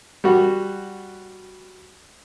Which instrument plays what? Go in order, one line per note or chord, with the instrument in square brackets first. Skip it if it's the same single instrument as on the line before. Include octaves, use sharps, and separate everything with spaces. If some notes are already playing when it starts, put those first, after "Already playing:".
[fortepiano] G3 F#4